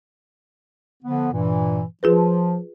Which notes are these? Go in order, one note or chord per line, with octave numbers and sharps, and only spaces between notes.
D3 F3 B3
G2 A#2 E3
F3 F4 G#4 B4